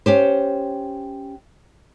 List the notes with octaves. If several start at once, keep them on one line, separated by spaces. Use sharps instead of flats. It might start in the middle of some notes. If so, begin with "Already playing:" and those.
C#4 G4 C5